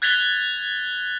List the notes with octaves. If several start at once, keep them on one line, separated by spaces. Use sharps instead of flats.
F#6 G#6 A6 B6 F7 G7